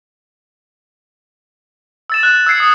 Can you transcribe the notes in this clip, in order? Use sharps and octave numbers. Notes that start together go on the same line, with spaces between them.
E6 A6 E7
F#6
E6 G#6 C7 C#7
D#6